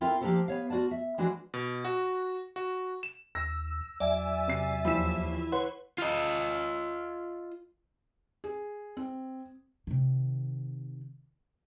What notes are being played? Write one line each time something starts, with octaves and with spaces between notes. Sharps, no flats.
C4 E4 F4 A4 A#4
F3 A#3 D4 G4 A4 C5
B3 C#5 F5
F4 F#4 B4 D5 A5
E5
E3 F3 G#3 D4 F4 F#4
B2
F#4
F#4
E7
D#2 E6 A#6
E2 F#3 D5 E5 G#5 E6
C3 C7
D#2 E3 F3 E4
B4 C#5 F#5 C6
F4 D#5
G#4
C4
C3 D#3